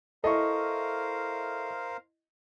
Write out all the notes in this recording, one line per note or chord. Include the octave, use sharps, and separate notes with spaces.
E4 A4 A#4 C5 D#5 F5 C#6